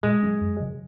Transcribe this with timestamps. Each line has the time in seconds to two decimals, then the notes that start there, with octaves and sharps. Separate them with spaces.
0.03 A#2 G#3
0.23 F#3 C#4
0.41 F#2
0.60 C#3 F#3